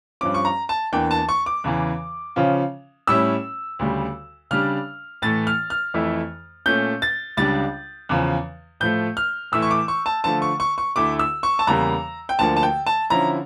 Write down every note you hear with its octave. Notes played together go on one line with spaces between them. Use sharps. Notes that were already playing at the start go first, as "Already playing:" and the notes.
G2 F3 C#4 D6
C#6
A#5
A5
E2 E3 A#3 D4 G5
A5
C#6
D6
E2 C#3 E3
C#3 F3 C#4 F4
A2 G3 C#4 E4 E6
D2 C#3 G3
C#3 G3 D4 F6
A2 E3 A3 A6
F6
F6
F2 E3 A3 E4
A#2 A3 C#4 G6
A6
C#2 C#3 G3 D4 A6
E2 C#3 F3
A2 F3 A3 G6
F6
A2 E3 A3 E4 E6
C#6
D6
C#6
A5
D3 F3 A3 A5
C#6
C#6
C#6
D2 D3 A3 E4 D6
E6
C#6
A5
E2 C#3 G3 A#3 A#5
G5
D2 D3 F3 A#3 A5
A5
G5
A5
D3 F3 C#4 E4 A#5